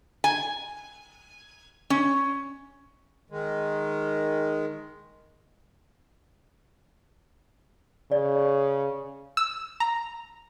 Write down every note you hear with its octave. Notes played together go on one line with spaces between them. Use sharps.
G#5
C#4
D#3 G#3
C#3 D5
E6
A#5